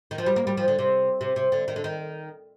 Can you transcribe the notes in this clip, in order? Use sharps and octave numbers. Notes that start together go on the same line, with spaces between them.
D#3
F3
G3
A#3
G3
F3
D3
C3
C3
C3
D3
D#3
D3
D#3